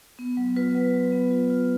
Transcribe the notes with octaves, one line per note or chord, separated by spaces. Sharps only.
B3
F#3
F4 B4
F#3
F#3
B3
F4
F4